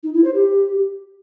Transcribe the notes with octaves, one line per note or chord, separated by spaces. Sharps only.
D#4
E4
C5
G4